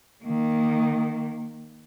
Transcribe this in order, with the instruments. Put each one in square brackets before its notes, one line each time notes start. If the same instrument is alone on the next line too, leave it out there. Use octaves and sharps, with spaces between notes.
[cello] D#3 A#3